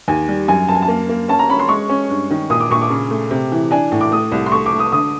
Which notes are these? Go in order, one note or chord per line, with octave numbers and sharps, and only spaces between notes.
D#2 G#5
G3
F#2 G#5
F#2 A5
G#5
A5
A#3
A#3
C#4 A5
A#5
C#4 B5
C6
G#3 C#6
C#4
G2
D#3
A#2 D#6
D6
A#2 C#6
D6
C#3
A3
C3
E3
D4 G#5
A2
D6
A3 D#6
C2
C6
A3 C#6
D6
A3
D#6
D3 D#6